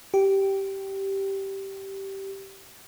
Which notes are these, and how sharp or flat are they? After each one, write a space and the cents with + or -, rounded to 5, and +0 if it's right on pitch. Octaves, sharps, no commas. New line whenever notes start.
G4 -10